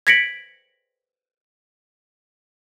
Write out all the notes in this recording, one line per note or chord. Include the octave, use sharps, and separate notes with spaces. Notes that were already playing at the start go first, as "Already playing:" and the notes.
G#6 A#6 B6 C#7 D7 F#7